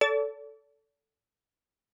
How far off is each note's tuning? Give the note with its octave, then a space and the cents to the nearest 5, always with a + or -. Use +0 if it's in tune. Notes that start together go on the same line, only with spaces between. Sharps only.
A4 +0 D5 -45